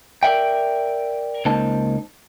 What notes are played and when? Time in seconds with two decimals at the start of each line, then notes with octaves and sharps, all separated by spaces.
0.23 A#4 D5 E5 G5
1.45 C#2 A#3 D#4 C5 A5